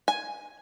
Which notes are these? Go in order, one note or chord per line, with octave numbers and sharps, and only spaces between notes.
G#5